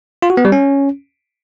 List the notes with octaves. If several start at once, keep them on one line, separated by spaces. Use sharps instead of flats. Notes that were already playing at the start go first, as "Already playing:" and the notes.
F4
F#4
B3
G3
C#4